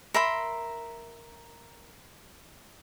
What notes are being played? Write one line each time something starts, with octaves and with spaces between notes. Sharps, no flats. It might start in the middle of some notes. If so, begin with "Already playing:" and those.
A#4 E5 B5 C6